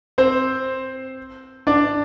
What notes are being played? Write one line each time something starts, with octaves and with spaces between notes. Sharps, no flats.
C4 C5
D4 D5